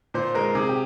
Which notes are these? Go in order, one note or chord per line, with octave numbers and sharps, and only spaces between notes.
A#2 C5
G#3 A#4
C3 G#4
G4